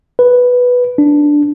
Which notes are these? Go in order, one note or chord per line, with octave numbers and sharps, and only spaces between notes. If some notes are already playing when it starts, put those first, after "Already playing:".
B4
D4